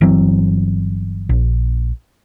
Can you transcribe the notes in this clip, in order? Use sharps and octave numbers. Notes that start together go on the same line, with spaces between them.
G1 E3 F#3 C4
A#1